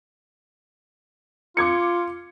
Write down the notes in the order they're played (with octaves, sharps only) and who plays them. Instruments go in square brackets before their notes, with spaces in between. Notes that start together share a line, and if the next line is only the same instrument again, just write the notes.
[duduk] F4 [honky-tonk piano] D6 G#6 C#7